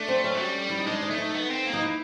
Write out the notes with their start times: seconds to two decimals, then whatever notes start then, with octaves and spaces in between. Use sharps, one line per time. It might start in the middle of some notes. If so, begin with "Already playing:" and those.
Already playing: A3 D4
0.08 C4
0.24 C#4
0.35 F#3
0.39 G3
0.70 E4
0.78 D#4
0.87 G#3 D4
1.02 D#4
1.10 A3
1.18 D#4
1.35 B3
1.50 C4
1.66 A#3
1.73 D#4
1.82 E4